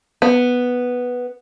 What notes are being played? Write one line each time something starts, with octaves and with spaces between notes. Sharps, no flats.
B3